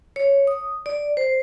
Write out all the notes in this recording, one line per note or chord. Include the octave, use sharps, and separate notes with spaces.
C#5
D#6
D5
C5